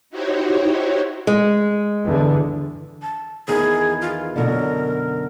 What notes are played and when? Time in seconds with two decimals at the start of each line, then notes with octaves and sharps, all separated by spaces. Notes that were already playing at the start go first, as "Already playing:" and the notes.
0.10 D#4 E4 F#4 G4 C5 C#5
1.27 G#3
2.05 E2 G2 D3
3.02 A5
3.48 E2 D#3 B3 G#4
4.01 F4
4.36 F#2 B2 D3 A#4